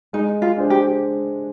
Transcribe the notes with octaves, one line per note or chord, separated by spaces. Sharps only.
G#3 D#4
F4
D4 G#4 C5
G4